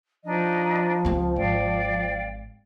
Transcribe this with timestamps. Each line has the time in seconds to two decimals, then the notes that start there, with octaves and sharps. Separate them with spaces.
0.25 F3 D4 D#4 D#5
1.05 C#2 C4
1.36 G#1 D5 F5 G5